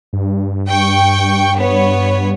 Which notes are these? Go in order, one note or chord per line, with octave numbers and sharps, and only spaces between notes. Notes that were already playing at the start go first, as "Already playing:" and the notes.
G2
G5 C#6
B3 C#5